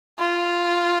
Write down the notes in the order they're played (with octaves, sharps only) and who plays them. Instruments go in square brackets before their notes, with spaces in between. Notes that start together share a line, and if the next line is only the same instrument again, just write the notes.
[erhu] F4